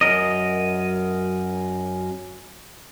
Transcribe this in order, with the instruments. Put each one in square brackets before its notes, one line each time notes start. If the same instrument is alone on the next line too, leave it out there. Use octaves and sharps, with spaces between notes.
[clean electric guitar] F#2 A#4 D#5